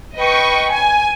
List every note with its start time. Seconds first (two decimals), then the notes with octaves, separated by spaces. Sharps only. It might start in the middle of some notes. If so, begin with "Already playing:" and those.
0.15 B4 D#5 G5 C#6
0.71 G#5